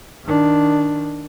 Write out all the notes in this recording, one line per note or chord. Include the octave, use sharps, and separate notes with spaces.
D#3 D4